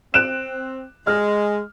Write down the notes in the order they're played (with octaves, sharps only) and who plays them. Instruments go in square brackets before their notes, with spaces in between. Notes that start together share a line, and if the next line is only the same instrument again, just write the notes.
[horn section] C4 [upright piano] F#6 D7 E7
[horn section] G#3 [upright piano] F6